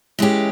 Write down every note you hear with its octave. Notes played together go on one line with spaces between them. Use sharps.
E3 G#3 C#4 G4